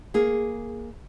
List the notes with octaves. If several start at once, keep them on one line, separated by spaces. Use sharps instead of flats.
A#3 G#4